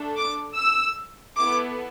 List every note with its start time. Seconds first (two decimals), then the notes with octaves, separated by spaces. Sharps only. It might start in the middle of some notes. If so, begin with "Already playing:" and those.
Already playing: A3 D4 A4
0.15 D6
0.56 E6
1.36 B3 E4 A4 D6